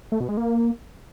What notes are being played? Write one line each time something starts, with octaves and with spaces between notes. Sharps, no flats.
A3
B2
G#3
A#3